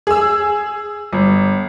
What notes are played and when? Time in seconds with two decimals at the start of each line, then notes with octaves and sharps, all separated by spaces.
0.07 G#4 E6
1.13 G1